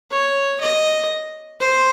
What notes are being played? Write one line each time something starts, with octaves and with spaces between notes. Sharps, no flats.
C#5
D#5
C5